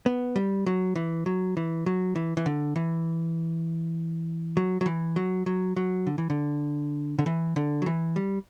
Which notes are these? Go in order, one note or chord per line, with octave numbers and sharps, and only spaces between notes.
B3
G3
F#3
E3
F#3
E3
F#3
E3
E3
D3
E3
F#3
F#3
E3
F#3
F#3
F#3
D3
E3
D3
D3
E3
D3
F#3
E3
G3